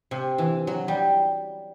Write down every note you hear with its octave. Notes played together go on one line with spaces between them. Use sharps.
C3
E3
F#3
G3